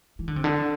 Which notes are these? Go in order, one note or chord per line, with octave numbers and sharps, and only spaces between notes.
E3
D3
C3
D3